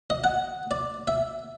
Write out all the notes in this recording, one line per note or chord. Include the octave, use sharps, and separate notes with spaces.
D#5
F#5
D5
E5